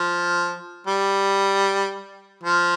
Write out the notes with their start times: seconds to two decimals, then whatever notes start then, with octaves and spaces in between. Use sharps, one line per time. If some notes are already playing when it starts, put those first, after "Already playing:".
Already playing: F3
0.87 G3
2.43 F3